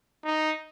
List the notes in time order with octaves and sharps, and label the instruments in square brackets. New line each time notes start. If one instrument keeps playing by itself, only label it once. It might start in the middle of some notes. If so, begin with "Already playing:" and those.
[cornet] D#4